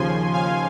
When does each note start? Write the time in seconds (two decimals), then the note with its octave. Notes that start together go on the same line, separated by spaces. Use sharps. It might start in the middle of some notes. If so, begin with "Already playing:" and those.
Already playing: D#2 C#3 F3 G#5 C6
0.34 F5 G#5